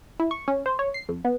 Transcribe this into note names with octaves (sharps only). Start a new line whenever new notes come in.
E4
C#6
C#4
C5
C#5
C7
F2
B3